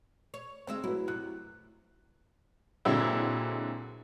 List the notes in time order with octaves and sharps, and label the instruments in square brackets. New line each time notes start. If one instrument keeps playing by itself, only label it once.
[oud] C#5
[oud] D2 G#3 E5 [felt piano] C4
[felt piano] F#3 B4 [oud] E4
[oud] F#2 C3 [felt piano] F#6
[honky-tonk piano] A#2 D3 F#3 G#3 C4 E4